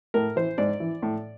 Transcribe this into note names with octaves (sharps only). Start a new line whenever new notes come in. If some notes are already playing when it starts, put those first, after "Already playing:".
A2 A#4
E3 C5
G#2 D5
E3
A2